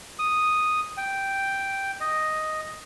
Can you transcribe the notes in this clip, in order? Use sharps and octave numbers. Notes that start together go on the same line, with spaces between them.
D#6
G5
D#5